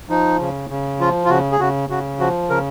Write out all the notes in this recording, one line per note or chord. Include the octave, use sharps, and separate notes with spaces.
F3 D#4
C#3
C#3
F3 F4
F4
C#3 F#4
G#4
C#3 F#4
C#3 F#4
F3 F#4
C#3 A#4